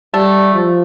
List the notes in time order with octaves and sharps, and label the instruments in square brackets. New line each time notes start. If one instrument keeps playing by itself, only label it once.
[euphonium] G3 [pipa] A3
[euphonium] F3